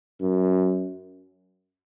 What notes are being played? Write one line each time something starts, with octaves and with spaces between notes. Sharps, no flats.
F#2